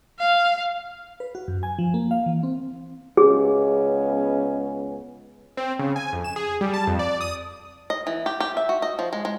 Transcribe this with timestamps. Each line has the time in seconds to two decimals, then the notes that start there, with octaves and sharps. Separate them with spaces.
0.19 F5
1.20 B4
1.35 F#4
1.48 F#2
1.63 G#5
1.79 F3
1.94 A#3
2.11 F5
2.26 E3
2.43 C4
3.17 C#2 B3 C#4 G#4
5.57 C4
5.79 C#3
5.96 G#5
6.13 F2
6.24 E7
6.36 G#4
6.61 G3
6.74 A5
6.87 F2
6.99 D5
7.21 D#6
7.90 D#5
8.07 E3
8.26 G4
8.40 G4
8.57 E5
8.69 F#4
8.82 D#5
8.99 F3
9.13 G#3
9.25 G#3